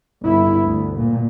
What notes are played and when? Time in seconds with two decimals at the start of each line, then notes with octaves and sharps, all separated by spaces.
0.22 G1 E4
0.64 D2
0.97 A#2